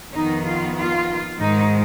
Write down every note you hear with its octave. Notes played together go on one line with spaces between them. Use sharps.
F2 D#3 B3 D#4
F4
F4
G#2 D#3 G#3 D#4